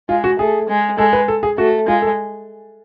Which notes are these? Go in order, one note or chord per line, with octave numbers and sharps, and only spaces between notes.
G#3 F4
F#4
A3 G#4
G#3
G#3 A4
B4
A4
G#4
A3 F#4
G#3 F4
A4